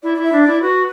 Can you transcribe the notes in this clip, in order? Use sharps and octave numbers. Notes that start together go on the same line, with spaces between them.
E4 D5
D5
E4
E5
D4
D5
E4
F#4 B4